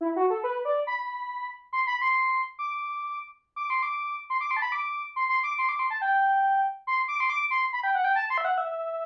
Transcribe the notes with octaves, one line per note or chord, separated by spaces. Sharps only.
E4
F#4
A4
B4
D5
B5
C6
B5
C6
D6
D6
C6
D6
C6
D6
C6
A5
B5
D6
C6
C6
D6
C6
D6
C6
A5
G5
C6
D6
C6
D6
C6
B5
G5
F#5
G5
A5
C6
E5
F#5
E5